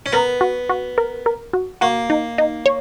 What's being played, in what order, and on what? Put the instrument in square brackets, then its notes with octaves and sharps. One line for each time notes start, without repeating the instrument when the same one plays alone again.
[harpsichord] C#4
[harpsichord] B3 [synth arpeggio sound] A#4
[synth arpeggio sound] F#4
F#4
A#4
A#4
F#4
[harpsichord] A#3 [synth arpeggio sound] F#4
[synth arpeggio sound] D#4
D#4
C#5